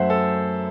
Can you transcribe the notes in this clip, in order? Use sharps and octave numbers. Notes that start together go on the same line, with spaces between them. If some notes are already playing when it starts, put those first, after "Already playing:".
Already playing: F#2 F#3 A3 C5 E5 F#5
A4